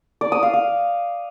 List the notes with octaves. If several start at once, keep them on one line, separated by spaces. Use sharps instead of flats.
D5
D#6
F5
F5